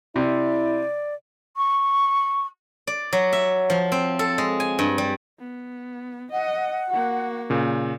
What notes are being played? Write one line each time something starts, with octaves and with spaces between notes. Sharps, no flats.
C3 E4 D5
C#6
D5
F#3
E5
F3
C4
A4
G#3
G#5
G2
G3
B3
D#5 F#5
A#3 F#4
A#2 C#3